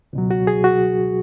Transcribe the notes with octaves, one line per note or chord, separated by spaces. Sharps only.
C#2 B2 F#3
F#4
G#4
F#4